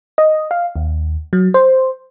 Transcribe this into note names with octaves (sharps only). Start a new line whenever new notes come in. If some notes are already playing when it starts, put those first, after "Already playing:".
D#5
F5
D#2
F#3
C5